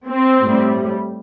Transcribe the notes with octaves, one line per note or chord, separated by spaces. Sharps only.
C4
A2 G3